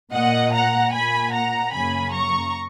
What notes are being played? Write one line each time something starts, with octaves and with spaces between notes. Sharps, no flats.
A#2 A#3 D#5 F#5
F#5 A#5
A#2 A#3 G#5 B5
F#5 A#5
F#2 C#3 F#3 A#3 G#5 B5
A#5 C#6